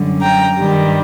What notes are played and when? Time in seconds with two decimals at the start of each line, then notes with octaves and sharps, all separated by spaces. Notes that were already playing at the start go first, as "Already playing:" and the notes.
Already playing: F#2 D3 G3
0.22 G5 A#5
0.58 G2 D#3 G3